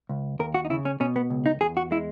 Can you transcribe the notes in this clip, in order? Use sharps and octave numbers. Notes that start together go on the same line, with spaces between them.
C#2
D#2 A#4
F#4
D#4
C#3 E4
C#4
B2 C#4
B3
C#2
D#4
E2 G#4
F#4
G#3 E4